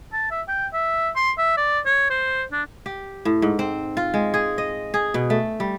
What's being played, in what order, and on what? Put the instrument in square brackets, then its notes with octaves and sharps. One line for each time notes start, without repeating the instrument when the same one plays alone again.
[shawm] A5
E5
G5
E5
C6
E5
D5
C#5
C5
D4
[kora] G4
A2
G#2
C4
F4
G#3
G#4
D#5
G#4
B2
A3
G3